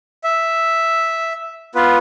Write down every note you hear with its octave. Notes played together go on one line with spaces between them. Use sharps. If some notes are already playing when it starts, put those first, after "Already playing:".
E5
B3 F4 B4